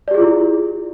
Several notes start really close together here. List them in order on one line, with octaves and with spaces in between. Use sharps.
D5 G4 G#4 F4 E4